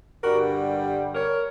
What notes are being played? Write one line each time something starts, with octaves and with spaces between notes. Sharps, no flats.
G2 D3 G3 F#4 A#4
A#4 C#5